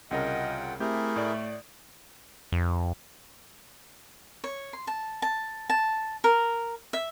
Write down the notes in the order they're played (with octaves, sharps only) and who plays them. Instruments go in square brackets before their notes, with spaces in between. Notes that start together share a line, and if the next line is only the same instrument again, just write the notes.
[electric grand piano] C2 C#3 A#4 [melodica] F4 F#5 G5 [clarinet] D#5
[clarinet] A3 [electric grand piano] C4 G4 G6 [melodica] E4 G#4 A#4
[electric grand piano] A2 D5
[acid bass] F2
[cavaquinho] C#5
C6
A5
A5
A5
A#4
E5